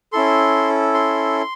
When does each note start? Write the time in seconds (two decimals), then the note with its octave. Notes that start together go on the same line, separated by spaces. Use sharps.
0.13 C#4 E4 A4 C6
0.94 C6